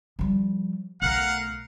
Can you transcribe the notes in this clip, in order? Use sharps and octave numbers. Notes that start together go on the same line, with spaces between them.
F3 G3
B1 A3 A#4 F5 F#5